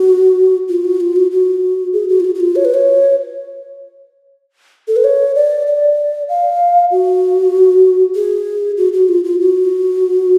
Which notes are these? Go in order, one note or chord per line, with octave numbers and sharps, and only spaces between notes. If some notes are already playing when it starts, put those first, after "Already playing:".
Already playing: F#4
F4
F#4
F4
F#4
F#4
G#4
F#4
F4
F#4
F#4
F4
C#5
B4
C#5
A4
B4
C#5
D5
D5
F5
F#4
G#4
F#4
F#4
F4
F4
F#4